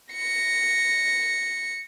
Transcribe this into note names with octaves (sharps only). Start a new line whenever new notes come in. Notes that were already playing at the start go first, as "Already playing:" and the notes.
A#6 C#7